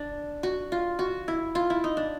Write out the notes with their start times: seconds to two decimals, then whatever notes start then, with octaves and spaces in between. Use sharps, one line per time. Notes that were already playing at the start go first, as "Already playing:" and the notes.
Already playing: D4
0.43 F#4
0.72 F4
0.99 F#4
1.28 E4
1.55 F4
1.70 E4
1.84 D#4
1.97 D4